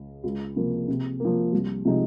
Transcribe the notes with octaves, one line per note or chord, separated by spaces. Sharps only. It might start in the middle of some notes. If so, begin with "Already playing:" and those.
Already playing: C#2
C#2
C3 F3 A#3
C3
F3 A#3
C2
C3 F3 G#3 D#4